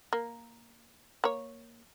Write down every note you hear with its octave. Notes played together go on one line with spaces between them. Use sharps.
A#3
A#3 C#5